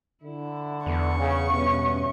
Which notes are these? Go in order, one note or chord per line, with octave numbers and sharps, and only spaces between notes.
D3 E4
E2 C#6
C#3
G2 B2 C#4